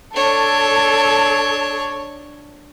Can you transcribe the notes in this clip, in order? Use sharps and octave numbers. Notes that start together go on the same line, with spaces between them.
D4 A4 C#5